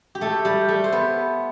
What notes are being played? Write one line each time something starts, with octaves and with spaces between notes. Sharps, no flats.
G4
A3 A4
G3 G4
A3 A4
C5
B3 B4